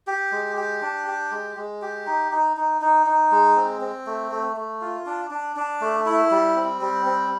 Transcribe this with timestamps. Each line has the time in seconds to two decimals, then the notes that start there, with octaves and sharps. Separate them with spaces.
0.07 G4
0.32 G#3
0.57 G4
0.82 D4
1.07 G4
1.31 G#3
1.57 G#3
1.82 G4
2.07 D#4
2.32 D#4
2.57 D#4
2.82 D#4
3.06 D#4
3.32 G#3
3.57 C4
3.81 C4
4.06 A3
4.31 A3
4.56 A3
4.81 F4
5.06 D4
5.31 D4
5.56 D4
5.81 A3
6.06 E4
6.31 G3
6.56 C4
6.81 G3
7.06 C4